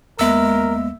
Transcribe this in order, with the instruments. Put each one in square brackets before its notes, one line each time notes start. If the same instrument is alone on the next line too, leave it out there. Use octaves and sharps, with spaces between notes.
[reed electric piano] D#2 B3 [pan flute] G#3 [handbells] A#3 E5 E6 [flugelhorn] A#4